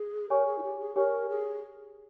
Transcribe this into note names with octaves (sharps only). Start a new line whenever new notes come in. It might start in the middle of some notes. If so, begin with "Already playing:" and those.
Already playing: G#4
G4 A#4 C#5 G#5 C#6
G#4
E4
G4
G#4
G4 A#4 C#5 G#5 C#6
G#4